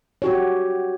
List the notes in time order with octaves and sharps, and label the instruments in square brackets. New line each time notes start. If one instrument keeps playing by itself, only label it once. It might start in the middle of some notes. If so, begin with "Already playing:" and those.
[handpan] F#4 G4 C#5